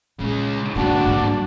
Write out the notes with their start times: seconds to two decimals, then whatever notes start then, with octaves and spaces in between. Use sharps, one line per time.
0.20 A#2 C#3 G#3
0.76 G2 A#2 D3 D4 F#4
1.06 G#2